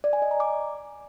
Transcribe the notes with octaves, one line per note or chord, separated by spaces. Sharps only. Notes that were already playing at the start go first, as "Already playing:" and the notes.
D5
G#5
D#5
A#5
D6